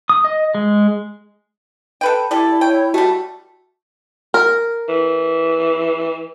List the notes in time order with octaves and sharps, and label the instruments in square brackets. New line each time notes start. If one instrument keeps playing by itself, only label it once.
[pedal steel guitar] D#6
D#5
G#3
[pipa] A4 B4 G5
[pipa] G3 A4 [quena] E4 [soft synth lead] D5
[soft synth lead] C#5 [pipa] G5
[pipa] G3 A3 [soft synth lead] F#4
[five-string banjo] A#4
[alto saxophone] E3